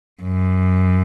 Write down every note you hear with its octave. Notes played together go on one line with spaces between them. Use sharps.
F#2